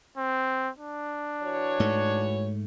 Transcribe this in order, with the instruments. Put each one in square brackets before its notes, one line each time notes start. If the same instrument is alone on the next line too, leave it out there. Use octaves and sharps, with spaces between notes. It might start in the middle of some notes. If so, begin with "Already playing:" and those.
[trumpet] C4
D4
[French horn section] E3 F#4 C#5
[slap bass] G#2 A3